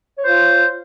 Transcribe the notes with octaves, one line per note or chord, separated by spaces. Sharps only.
F4 C5 C#5